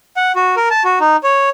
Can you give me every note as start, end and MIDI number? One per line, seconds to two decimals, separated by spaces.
0.17 0.32 78
0.36 0.55 66
0.57 0.69 70
0.70 0.83 81
0.84 0.99 66
1.00 1.16 63
1.23 1.49 73